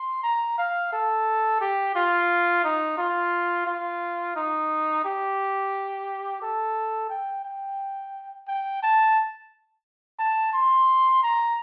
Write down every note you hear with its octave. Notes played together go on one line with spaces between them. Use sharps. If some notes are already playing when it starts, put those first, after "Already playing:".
Already playing: C6
A#5
F5
A4
G4
F4
D#4
F4
F4
D#4
G4
A4
G5
G5
G5
A5
A5
C6
A#5